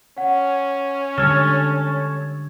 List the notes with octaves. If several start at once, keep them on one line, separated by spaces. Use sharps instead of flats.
C#4 F#5
D3 G3 G#3 A4 C#5 F6